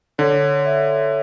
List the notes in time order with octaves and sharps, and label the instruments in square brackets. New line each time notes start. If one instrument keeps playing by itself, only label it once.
[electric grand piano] D3 [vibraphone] C#5
[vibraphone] E5